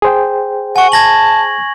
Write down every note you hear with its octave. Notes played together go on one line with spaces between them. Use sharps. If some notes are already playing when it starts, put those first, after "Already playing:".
G#4 C5 G5
F#5 G#5 C#6
A5 G#6 A#6 F#7